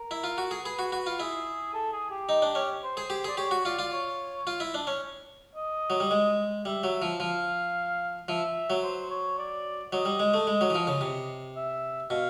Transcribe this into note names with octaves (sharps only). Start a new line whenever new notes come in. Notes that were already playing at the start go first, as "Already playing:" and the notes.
Already playing: A#4
E4
F4
F#4
G#4
G#4 B4
F#4
F#4
F4
E4 G#4
A4
G#4
G4
D#4
D4
C#4
C5
G#4
G4
G#4 D5
G4 C#5
F#4
F4 D5
F4
C#5
F4
E4
D4
C#4
D#5
F#3
G3
G#3
G3 E5
F#3
F3
F3 F5
F3 E5
F#3
C5
C#5
D5
F#3 D#5
G3
G#3
A3
G#3
F#3
E3
F3
C#3
C3
E5
B2 F5